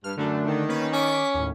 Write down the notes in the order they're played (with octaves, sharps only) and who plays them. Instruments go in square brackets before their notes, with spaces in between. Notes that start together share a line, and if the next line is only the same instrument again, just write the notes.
[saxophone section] G2 [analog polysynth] F6
[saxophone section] F#2 [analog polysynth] D3 A3 D4
[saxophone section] D#3
[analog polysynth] A#3 C#4 B4
[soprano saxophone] C#4 [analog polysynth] D6 B6
[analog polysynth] D#2 A2